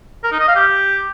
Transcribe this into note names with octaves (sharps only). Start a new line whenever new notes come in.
A#4
D#4
D#5
F5
G4